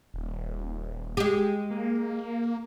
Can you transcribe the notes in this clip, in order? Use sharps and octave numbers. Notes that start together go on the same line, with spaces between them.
D#1
G#3 G4
A#3